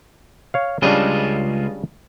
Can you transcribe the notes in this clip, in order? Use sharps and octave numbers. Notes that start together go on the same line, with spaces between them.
C#5 F5
C#2 C#3 G3 D4 F4 D#5